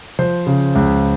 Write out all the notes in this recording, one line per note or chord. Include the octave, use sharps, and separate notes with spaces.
F3 C5
C#3
C#2